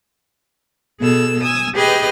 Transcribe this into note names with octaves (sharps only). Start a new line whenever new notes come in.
B2 G#4 A4 E6
G#5 D#6 E6
G4 G#4 B4 D#5 G5 F6